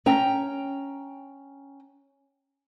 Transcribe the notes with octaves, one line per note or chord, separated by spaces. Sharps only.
C#4 G5 A#5